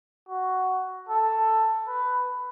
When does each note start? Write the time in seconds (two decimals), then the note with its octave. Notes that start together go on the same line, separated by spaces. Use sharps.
0.29 F#4
1.09 A4
1.87 B4